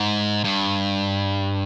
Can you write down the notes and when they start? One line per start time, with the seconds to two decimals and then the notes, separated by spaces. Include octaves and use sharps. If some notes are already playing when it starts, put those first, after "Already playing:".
Already playing: G#2
0.44 G2